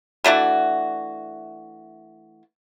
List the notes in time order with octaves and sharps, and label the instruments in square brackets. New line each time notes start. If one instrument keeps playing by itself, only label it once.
[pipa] E3 A3 D4 F#4